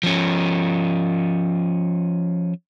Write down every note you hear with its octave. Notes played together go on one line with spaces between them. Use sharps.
F3 C#4